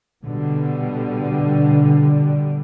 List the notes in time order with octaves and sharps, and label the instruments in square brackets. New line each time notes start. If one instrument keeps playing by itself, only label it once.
[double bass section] B2 D3 G3